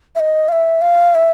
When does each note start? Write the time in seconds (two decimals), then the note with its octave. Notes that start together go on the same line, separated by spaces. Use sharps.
0.15 E5
0.20 D#5
0.48 F5
0.52 E5
0.81 F5
1.15 E5